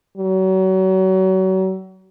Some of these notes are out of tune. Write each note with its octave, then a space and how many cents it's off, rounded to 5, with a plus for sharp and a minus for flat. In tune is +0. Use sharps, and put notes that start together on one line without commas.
F#3 +35